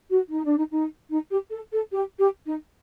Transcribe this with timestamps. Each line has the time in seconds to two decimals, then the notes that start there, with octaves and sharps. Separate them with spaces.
0.10 F#4
0.30 D#4
0.44 D4
0.57 D#4
0.71 D#4
1.11 D#4
1.31 G4
1.51 A4
1.72 A4
1.92 G4
2.18 G4
2.45 D#4